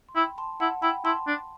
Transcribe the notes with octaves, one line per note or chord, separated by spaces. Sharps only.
C6
E4 G5 B5
A5 C6
E4 F#5 A5
E4 G5 B5
E4 A5 C6
D4